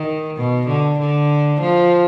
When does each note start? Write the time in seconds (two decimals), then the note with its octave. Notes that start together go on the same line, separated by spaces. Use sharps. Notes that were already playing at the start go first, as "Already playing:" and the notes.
Already playing: D#3
0.37 B2
0.68 D3
0.99 D3
1.61 F3